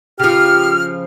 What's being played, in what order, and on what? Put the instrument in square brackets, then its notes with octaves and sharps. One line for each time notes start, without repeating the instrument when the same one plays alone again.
[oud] C#3 F3 [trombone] G4 [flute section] F6